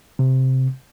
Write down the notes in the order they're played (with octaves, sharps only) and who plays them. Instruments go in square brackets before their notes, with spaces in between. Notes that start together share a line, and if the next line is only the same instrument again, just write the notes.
[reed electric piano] C3